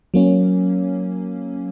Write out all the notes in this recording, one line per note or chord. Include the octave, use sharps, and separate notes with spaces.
F#3 A#3 C#4